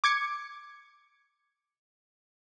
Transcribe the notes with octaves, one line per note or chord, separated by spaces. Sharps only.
D6 G#6 C#7